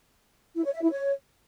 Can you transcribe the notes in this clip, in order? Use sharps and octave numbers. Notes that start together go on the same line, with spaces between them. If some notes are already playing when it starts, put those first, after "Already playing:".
E4
C#5
E5
E4
C#5